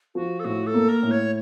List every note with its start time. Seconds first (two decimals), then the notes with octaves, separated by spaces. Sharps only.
0.15 F3 F#4
0.40 A4
0.44 A2 F#4
0.67 A4
0.74 A#3
0.89 A#4
1.03 A2
1.11 C#5